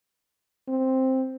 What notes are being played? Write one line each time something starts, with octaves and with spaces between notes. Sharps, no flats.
C4